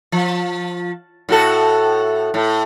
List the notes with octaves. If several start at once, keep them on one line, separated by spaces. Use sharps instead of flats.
F3
A2 F#4 A4
A2